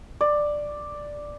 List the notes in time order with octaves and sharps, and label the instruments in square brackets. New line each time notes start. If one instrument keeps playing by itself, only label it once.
[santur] D5